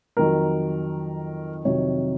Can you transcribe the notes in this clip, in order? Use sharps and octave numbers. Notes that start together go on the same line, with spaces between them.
F2 D#3 F#3 A#4
F2 C3 D#3 F#3 C#5